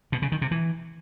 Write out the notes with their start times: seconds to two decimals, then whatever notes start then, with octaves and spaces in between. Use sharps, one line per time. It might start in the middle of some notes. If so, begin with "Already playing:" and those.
0.12 B2
0.22 C#3
0.32 D#3
0.42 C3
0.51 E3